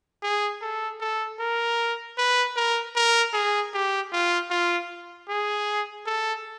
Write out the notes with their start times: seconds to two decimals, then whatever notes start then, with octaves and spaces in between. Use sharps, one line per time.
0.23 G#4
0.62 A4
1.01 A4
1.40 A#4
2.18 B4
2.56 A#4
2.96 A#4
3.34 G#4
3.74 G4
4.12 F4
4.51 F4
5.29 G#4
6.06 A4